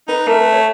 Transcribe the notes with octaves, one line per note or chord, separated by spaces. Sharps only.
D#4 B4
A3 A#4
B4
C#5